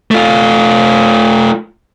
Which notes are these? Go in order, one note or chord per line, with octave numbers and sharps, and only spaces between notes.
A3 F4